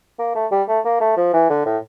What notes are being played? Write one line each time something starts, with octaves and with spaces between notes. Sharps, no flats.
A#3
A3
G3
A3
A#3
A3
F3
E3
D3
A2